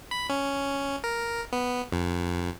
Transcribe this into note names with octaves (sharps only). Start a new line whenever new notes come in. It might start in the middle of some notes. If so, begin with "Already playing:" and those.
B5
C#4
A#4
B3
F2